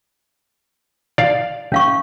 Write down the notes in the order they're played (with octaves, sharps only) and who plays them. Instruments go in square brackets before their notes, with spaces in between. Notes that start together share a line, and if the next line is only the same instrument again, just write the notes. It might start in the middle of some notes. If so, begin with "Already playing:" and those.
[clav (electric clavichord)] D5 F5
[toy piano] C#4 F5 C#6